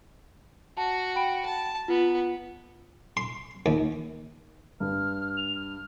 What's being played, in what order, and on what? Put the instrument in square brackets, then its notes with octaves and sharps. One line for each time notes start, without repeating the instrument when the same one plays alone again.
[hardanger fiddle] F#4 [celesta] A5
[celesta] G5 B5 D7
[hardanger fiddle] A5
[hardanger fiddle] B3 [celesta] F4
[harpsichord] C6
D#2
[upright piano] G2 [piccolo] F6
[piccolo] F7
F6